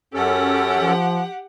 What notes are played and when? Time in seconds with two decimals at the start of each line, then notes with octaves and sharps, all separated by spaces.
0.14 F#2 C#4 G4 A4 F#5
0.79 F3